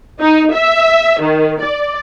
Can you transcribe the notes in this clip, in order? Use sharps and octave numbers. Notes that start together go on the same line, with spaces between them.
D#4
E5
D#3
D5